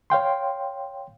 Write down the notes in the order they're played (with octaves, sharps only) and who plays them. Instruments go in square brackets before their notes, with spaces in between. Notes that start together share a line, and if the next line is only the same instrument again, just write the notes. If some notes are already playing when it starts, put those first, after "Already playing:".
[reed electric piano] C#5 F5 G5 C6